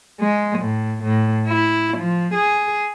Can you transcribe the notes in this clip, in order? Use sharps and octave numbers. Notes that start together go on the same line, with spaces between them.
G#3
A2
A2
E4
F3
G#4